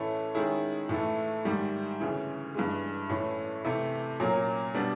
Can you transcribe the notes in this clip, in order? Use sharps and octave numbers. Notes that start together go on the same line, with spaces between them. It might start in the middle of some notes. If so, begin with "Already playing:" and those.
Already playing: A2 E3 A3 C#4
D#3 G#3 C#4 E4 G#4
A2 E3 A3
G#2 D#3 G3
D2 C#3 E3
G2 E3 G#3
A2 E3 A3 C#4
C3 E3 A3
A#2 F#3 A#3 C#4
B2 G3 B3 D4